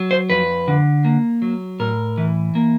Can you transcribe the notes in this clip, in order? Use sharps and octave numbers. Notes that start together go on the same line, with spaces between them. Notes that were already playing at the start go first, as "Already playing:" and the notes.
Already playing: F#3
C5
F2 B4
D3
A#3
F#3
A2 A#4
E3
A#3